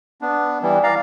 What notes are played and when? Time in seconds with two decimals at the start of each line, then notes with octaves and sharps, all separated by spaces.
0.22 B3 D4
0.62 E3 G3
0.83 D5 F5 A#5